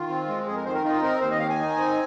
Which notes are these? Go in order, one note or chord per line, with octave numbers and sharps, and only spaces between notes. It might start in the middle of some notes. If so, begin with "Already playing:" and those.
Already playing: D#3 F4
C4
G#3
F2 G#4
A#4
D#3 C5
A#4
D#4 F4
C4 A#4
D#2 C5
D#5
D#3 F5
G#5
D#4
C4